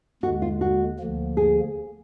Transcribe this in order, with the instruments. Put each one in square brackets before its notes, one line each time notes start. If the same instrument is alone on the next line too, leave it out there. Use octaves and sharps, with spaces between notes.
[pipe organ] D#2 D3 G#3 [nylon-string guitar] F#4
[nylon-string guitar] F4
F#4
[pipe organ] D2 D3 F3 A#3
[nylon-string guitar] G#4